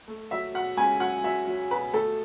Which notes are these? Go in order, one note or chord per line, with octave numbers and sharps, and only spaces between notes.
A3
F#3 E5
B2 F#5
C#2 G#5
F#3 F#5
F#3 E5
F#3
B2 B4
A3 A4